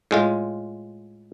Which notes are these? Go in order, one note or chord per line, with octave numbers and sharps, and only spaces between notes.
A2 G#3 F4